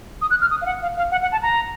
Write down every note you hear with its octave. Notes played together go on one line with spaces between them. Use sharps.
D#6
F#6
F6
D#6
F5
F#5
F5
F5
F#5
F#5
A5
A#5